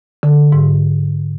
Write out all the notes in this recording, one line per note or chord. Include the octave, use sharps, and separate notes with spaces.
D3
G#2